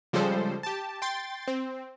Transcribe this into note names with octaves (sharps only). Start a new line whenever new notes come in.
C#3 F3 G3 G#3 A4 C5
G4 A5
G5 C6 A6
C4